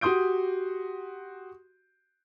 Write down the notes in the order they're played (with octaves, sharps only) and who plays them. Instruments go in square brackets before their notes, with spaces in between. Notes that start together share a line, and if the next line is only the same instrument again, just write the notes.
[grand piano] F#4 G4 C6 D#6 G6 D7